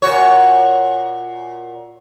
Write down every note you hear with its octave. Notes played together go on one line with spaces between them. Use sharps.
A#2 F#4 C#5